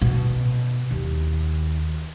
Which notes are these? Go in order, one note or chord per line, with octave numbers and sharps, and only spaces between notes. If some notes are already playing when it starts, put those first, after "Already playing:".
B2
D#2